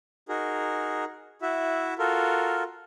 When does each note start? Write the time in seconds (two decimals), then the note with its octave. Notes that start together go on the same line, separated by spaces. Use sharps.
0.29 D#4 F#4 G#4 A#4
1.42 E4 F#4 E5
1.99 F4 F#4 A4 A#4